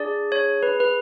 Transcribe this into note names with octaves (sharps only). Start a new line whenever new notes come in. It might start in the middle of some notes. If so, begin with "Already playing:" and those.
Already playing: D4 G#4 D5
C#5
B4
B4